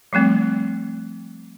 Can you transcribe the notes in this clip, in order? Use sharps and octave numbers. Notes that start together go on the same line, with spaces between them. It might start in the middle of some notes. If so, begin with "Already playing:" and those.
F3 G3 A3 C4